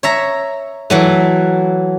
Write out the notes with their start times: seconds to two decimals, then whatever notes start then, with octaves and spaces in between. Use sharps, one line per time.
0.03 C#5 E5 A#5
0.90 E3 F#3 A3